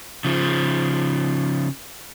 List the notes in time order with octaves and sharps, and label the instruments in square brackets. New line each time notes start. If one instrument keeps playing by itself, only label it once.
[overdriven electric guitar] C#3 F3